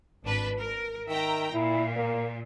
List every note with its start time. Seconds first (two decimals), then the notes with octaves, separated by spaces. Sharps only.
0.23 G#1 D4 B4
0.59 A#4
1.09 D#3 E5 G5 A#5
1.53 A#2 E4
1.96 A#3